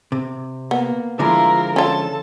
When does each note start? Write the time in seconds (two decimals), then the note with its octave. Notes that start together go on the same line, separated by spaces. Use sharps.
0.12 C3
0.71 A#3 B3
1.19 D3 F3 G#3 E4 F4 A#4
1.76 C#4 F4 A4 A5